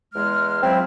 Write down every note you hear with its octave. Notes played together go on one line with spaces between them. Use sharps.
E2 G#3 F6
F3 F#3 C4 E4